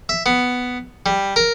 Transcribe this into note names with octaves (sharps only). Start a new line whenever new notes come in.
E5
B3
G3
A#4